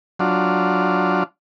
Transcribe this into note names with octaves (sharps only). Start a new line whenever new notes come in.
F#3 D4 F4